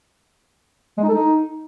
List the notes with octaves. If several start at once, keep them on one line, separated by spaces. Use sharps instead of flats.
G#3
D#4
A4
D#4